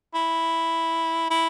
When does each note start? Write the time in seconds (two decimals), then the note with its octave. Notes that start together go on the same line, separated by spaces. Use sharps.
0.14 E4
1.30 E4